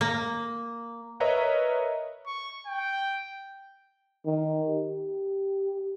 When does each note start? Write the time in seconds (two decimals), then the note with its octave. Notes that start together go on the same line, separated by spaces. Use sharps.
0.01 A#3
1.20 A#4 B4 C#5 D#5 E5 A#5
2.26 C#6
2.66 G5
4.26 D#3
4.69 G4